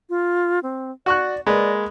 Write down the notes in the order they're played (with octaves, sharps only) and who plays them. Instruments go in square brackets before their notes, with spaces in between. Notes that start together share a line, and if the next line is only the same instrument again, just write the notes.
[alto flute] F4
C4
[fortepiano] F#4 C#6 F#6 [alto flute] D5
[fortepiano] G#3 A#3 B4 [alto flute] D5